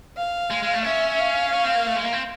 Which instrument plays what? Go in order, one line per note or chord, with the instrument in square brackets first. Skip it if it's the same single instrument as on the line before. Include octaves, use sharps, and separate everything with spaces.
[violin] F5
[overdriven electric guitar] G#3
G#3
A3
[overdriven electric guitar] C#4 [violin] E5
[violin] F5
[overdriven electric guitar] C#4
C4
A#3
A3
G#3
A#3
C4